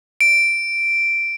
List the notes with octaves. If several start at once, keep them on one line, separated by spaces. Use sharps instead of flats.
D7